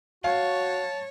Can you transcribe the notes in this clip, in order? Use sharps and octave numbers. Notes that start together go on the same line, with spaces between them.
F#4 C#5 F5 A5